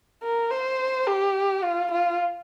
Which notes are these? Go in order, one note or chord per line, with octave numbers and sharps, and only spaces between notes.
A#4
C5
G4
F4
F4